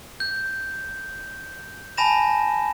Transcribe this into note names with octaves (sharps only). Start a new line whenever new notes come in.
G6
G#5 A5 B5 A#6 E7